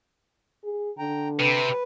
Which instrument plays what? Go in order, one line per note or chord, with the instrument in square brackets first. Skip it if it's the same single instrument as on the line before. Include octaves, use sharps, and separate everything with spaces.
[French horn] G#4
[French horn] D3 [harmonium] G5 A#5
[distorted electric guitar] C3 [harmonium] B4